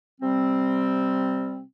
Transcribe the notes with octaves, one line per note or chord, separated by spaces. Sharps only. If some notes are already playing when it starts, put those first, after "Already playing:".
C3 G3 C4